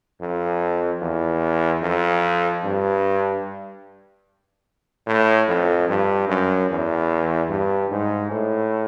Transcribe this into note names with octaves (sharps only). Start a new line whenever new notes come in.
F2
E2
F2
G2
A2
F2
G2
F#2
E2
G2
G#2
A2